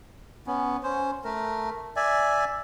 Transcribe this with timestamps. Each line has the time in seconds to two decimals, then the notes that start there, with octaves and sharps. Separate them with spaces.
0.47 B3 C#4
0.83 C#4 C5
1.24 A3 A#4
1.96 D5 E5 G#5